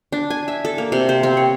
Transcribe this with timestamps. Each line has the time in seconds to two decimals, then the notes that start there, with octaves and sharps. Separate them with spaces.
0.12 D4
0.30 G#5
0.48 E5
0.65 A4
0.78 A#3
0.92 C3
1.09 C5
1.23 C4
1.37 C#5